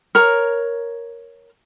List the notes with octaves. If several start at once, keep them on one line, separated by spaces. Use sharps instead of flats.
A#4 C#5 A#5